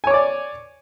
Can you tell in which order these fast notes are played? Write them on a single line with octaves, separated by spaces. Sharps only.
G#5 C#5 D6 D5